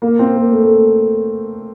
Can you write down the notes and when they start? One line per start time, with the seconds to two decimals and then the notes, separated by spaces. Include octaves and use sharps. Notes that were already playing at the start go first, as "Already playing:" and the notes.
0.02 A#3
0.19 C4
0.35 A#3
0.52 A3
0.64 A3